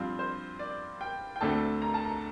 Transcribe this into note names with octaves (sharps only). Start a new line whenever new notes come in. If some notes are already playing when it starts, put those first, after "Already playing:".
Already playing: G2 F3 C4 F4
C5
D5
G5
G5
D2 D3 A3 C4 A5
A#5
A5
A#5